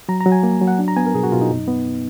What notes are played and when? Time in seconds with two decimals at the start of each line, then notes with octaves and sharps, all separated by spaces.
0.09 F#3 A#5
0.21 A#5
0.26 F#3
0.32 G#5
0.43 A#3
0.61 F#3
0.68 F#5
0.79 D4
0.88 A#5
0.97 B3 G#5
1.06 A#4
1.14 B2 G#4
1.23 F#4
1.32 B2 F4
1.41 D#4
1.51 F#2
1.68 B3